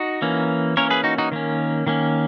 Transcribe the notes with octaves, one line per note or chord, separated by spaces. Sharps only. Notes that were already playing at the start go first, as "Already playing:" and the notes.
Already playing: D#4 F#4
E3 A#3 C#4
E3 A#3 C#4 A#4 C#5
G#4 B4
D#4 F#4
D#4 F#4
D#3 A#3 C#4
D#3 A#3 C#4